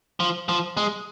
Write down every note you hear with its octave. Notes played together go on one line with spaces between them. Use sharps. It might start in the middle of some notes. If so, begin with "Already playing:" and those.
F3
F3
G#3